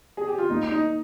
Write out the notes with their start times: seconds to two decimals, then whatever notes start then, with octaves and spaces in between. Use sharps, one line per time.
0.17 G#4
0.28 G4
0.38 F4
0.50 A#3 D#4
0.71 D#4